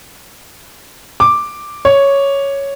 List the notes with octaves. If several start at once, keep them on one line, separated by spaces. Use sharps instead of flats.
D6
C#5